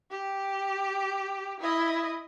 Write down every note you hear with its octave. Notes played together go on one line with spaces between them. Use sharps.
G4
E4 D#5